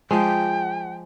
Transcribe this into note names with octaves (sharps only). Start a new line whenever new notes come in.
F3 G#3 G5